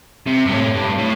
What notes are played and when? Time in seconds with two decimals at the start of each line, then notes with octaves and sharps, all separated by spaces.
0.27 C3
0.46 G2
0.51 A2
0.75 G2
0.98 A2